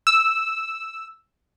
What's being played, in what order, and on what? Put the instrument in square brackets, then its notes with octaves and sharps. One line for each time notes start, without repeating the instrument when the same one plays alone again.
[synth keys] E6